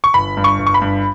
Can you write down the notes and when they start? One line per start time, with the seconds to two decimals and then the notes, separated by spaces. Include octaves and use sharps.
0.04 C#6
0.14 G1 B5
0.37 G2
0.44 C#6
0.59 G1
0.67 C#6
0.74 B5
0.82 G2